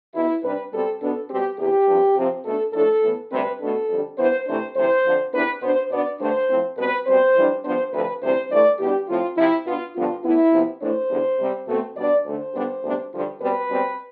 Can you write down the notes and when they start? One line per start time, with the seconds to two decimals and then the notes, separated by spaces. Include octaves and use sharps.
0.14 E2 B2 B3 E4
0.43 C3 G3 D4 B4
0.72 B2 G3 C4 A4
1.00 B2 B3 D4 A4
1.29 B2 G3 C4 G4
1.58 E2 C3 E3 G4
1.88 G2 F3 C4
2.16 C3 F3 C4
2.45 B2 A3 D4 A4
2.73 A2 F3 A3 D4 A4
3.03 A2 E3 B3
3.32 D2 C3 G3 C4 B4
3.60 B2 A3 D4 A4
3.89 F2 D3 G3
4.17 G2 E3 B3 C5
4.47 C3 E3 A3 D4 C5
4.76 D2 C3 E3 C5
5.04 F2 D3 F3
5.33 E2 C3 E3 B3 D4 B4
5.62 B2 B3 D4 C5
5.91 B2 B3 D4 D5
6.19 G2 D3 A3 D4 C5
6.49 A2 F3 C4
6.78 B2 G3 C4 B4
7.07 B2 G3 C4 C5
7.35 F2 E3 G3 D4
7.64 G2 F3 B3 D4 C5
7.92 D2 C3 F3 A3 B4
8.22 D2 C3 E3 G3 C4 C5
8.51 G2 E3 A3 D5
8.79 E2 B2 G3 D4 G4
9.08 A2 F3 C4 F4
9.37 C3 F3 C4 E4
9.66 B2 B3 D4 F4
9.95 G2 D3 F3 B3 F4
10.24 A2 E3 B3 E4
10.52 C3 F3 B3
10.81 A2 E3 A3 D4 C5
11.10 E2 D3 G3
11.39 C3 G3 C4
11.68 B2 A3 C4
11.96 B2 G3 B3 D4 D5
12.25 D2 D3 A3 C5
12.54 G2 D3 G3 B3 D4
12.83 D2 C3 G3 B3 D4
13.12 G2 D3 F3
13.41 B2 G3 C4 B4
13.70 B2 G3 C4